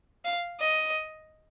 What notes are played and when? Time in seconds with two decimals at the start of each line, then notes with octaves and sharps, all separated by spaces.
0.25 F5
0.60 D#5